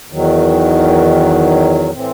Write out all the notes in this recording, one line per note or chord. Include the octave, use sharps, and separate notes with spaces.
E2 D#3 F#3
A2 E3 C4